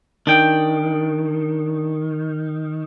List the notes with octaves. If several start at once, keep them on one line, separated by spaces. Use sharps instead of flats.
D#3 D4 G5